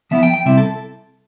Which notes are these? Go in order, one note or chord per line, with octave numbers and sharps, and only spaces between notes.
F3 B3 E4 E5
G5
G5
C3 G3 C4 E4 E5
A4